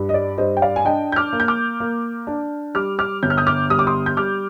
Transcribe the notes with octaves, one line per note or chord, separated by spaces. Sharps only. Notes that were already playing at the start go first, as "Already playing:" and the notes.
Already playing: G2
D#5
D5
G2 C5 D#5
G5
D5 F5
G#5
D4 D#5 G5
G6
D6 F6
A#3
G6
D6 F6
A#3
D4
G3 D6 F6
D6 F6
G1 G6
F6
D#6 G6
D6 F6
G3 D#6
D6
C6 D#6
G6
G3 D6 F6